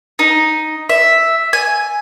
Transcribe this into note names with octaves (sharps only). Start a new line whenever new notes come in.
D#4
E5
G#5